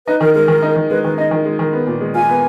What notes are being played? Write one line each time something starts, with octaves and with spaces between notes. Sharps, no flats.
D#4 B4
D#3 A#4
G#3 A#4
D#3
D#4
D#3
G#3 B4
D#3 B4
D#4 D#5
D#3
G#3
D#3
B3
A#2
G#3
F4 G#5
B3